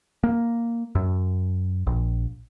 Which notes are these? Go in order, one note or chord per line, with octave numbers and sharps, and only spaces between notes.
A#3
F#2
A#1